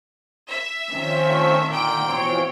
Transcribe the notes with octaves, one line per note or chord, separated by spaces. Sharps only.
E5
D#3 F3 C4 C#4
A3
A#2 D3 G5 D7
B2 E3 F3 C4 C#5